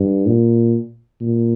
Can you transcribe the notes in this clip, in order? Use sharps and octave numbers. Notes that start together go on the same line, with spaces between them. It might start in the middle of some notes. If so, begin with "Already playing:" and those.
Already playing: G2
A#2
A#2